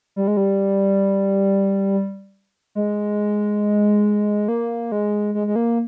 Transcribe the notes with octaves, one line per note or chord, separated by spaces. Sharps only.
G3
G#3
G3
G#3
A#3
G#3
G#3
G#3
A#3